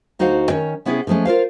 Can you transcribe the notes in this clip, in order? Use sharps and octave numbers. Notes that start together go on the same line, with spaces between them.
D2 D#4 F#4 C5 F5 F#5
D#3 C#4 C#5
C3 B3 C#4 E4 G#4
D3 F3 G#3 A3 C#4
F4 A#4 C5 F5